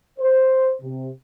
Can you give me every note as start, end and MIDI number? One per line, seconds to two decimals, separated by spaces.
0.19 0.74 72
0.82 1.10 48